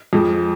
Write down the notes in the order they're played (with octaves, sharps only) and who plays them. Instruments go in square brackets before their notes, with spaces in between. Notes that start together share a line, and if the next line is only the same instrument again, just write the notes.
[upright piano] F2 F3 G#3